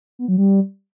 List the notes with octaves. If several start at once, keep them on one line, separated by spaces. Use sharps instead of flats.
B3
F#3
G3